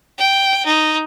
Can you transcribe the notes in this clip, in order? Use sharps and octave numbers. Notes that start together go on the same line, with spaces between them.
G5
D#4